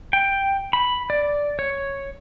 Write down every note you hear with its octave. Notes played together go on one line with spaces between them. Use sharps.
G5
B5
D5
C#5